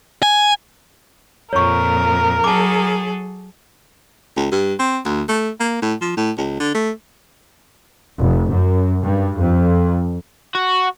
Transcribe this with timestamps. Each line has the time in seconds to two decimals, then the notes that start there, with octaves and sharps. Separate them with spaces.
0.23 G#5
1.53 F2 A#2 A#4 C#5 C#6
2.44 F#3 G#4 A4 A5 D6
4.37 C#2
4.52 G2
4.79 C4
5.05 D2
5.29 A3
5.60 A#3
5.82 A2
6.01 F3
6.17 A2
6.38 C#2
6.60 D3
6.74 A3
8.19 F1
8.50 F#2
9.04 G2
9.41 F2
10.55 F#4